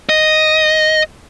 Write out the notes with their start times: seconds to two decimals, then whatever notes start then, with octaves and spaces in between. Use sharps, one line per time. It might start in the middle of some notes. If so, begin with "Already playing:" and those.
0.09 D#5